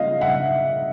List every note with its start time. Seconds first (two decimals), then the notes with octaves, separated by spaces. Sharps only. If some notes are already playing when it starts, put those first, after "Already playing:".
Already playing: C#3 F3 A#3 D#5 F5
0.21 E5 F#5